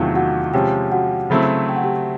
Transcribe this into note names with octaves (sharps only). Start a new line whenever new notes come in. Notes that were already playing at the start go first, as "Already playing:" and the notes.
Already playing: E2 C3 D#3 F#3 A3 F4 F5
F#4 F#5
C3 F3 G#3 C#4 G4 G5
F#4 F#5
C#3 F#3 A3 C4 E4
G5
F#5
G4 G5